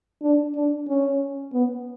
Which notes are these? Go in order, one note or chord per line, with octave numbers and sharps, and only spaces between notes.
D4
D4
C#4
B3